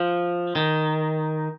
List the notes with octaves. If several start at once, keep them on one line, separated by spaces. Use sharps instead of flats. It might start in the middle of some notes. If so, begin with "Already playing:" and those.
Already playing: F3
D#3